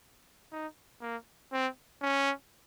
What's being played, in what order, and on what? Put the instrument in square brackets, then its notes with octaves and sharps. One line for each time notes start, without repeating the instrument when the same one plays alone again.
[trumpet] D#4
A#3
C4
C#4